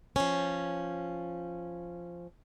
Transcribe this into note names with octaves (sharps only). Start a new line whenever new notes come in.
F3 C#4